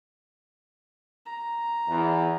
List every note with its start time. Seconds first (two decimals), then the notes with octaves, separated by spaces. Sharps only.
1.26 A#5
1.88 E2